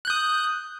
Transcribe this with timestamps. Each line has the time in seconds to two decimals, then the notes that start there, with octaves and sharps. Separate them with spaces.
0.05 F#6
0.07 G6
0.10 D#6